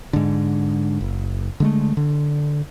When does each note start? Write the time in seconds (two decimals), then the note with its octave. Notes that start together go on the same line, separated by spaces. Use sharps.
0.13 G#2 D3
1.01 F#1
1.60 D3 G#3 A3
1.97 D3